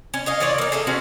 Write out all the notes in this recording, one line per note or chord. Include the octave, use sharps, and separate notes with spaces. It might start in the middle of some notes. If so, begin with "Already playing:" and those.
C#4
C#5 D#5 F5
E3 F4 C#5 D5
A#3 D#4
G#4 A4 E5
C#4 F#4 C5